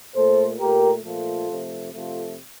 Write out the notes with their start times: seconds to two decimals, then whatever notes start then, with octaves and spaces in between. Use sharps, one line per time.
0.15 A#2 A3 A4 C5
0.59 A#2 A3 G4 A#4
1.03 A#2 F3 A3 F4 A4
1.48 C3 F3 A3
1.93 C3 F3 A3 F4 A4